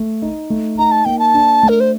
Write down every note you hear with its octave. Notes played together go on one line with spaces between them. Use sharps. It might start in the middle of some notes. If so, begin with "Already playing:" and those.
Already playing: A3
D#4
A3
D#4 A#5
A5
A#3 G5
A5
D4
A3
A#4
C5